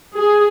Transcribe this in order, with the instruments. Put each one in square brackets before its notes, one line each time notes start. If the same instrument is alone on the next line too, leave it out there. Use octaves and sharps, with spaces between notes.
[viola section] G#4